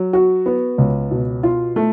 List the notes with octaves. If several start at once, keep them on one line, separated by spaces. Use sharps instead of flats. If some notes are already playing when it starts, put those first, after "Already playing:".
Already playing: F#3
F#4
B3
C#2
B2
F4
A3